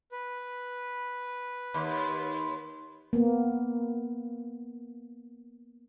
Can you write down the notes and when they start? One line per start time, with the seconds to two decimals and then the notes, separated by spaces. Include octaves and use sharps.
0.12 B4
1.74 D#2 B5 C6
3.13 A#3 B3